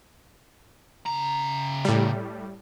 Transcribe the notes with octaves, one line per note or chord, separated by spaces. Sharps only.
C#3 A#5
A2 G3